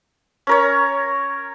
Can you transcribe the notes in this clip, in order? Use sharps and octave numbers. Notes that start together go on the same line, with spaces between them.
C#4 A#4 C#5